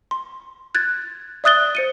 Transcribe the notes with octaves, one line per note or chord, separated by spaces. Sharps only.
C6
F#6 G#6 A6
D5 E5 D#6 F#6 A6 G7
C5 C#7 D#7